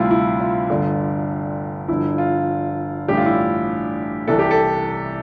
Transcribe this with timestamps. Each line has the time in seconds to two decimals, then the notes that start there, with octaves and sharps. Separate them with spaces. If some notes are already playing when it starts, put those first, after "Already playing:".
Already playing: D2 C3 G3 C4 E4 F4
0.11 E4
0.40 F4
0.70 G1 G2 D3
1.88 G1 G2 F3 E4
2.18 F4
3.08 A1 G2 D3 G4
3.17 F4
3.26 E4
3.34 F4
4.27 C2 C3 E3 A4
4.39 G4
4.51 A4